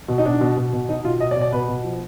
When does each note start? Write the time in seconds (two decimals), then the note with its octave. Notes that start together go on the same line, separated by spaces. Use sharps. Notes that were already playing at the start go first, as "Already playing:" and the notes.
0.08 B2
0.18 D#4
0.25 B2 D4
0.41 B2
0.57 B2
0.73 B2
0.89 B2 D#4
1.04 B2 F4
1.20 B2 D#5
1.31 D5
1.36 B2
1.41 D5
1.52 B2 B4
1.68 B2
1.84 F3